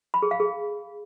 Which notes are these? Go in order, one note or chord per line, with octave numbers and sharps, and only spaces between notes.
B5
G#4
F5
G#4